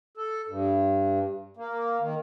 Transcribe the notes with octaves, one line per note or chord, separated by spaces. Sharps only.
A4
G2
A#3
D#3